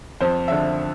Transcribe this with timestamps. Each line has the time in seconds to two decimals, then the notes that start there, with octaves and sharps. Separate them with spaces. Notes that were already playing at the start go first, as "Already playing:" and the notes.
0.20 F2 C5
0.48 D3 F3 E5